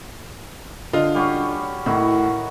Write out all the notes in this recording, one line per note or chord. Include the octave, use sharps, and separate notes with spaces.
D3 F4 D#5
G3 C#4 F#4
A2 D#3 E4 F#4